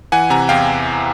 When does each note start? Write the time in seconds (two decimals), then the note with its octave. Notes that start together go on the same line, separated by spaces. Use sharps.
0.12 E3 F#5 G#5
0.30 C3 G#5 A#5
0.49 E2 F5 G5